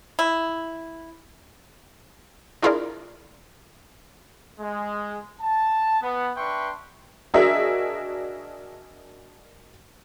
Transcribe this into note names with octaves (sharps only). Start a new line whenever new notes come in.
E4
D4 E4 F4 G#4 A#4 D5
G#3
A5
B3
D4 B4 E5 G5 C6 C#6
D4 F#4 G#4 A#4 D#5 E5